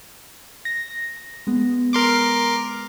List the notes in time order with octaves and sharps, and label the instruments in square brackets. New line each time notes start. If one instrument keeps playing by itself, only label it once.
[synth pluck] A#6
G#3 B3
[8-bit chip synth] A#4 C6 D6